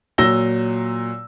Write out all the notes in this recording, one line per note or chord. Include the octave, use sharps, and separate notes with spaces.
A#2 F#3 E6 A#6 G7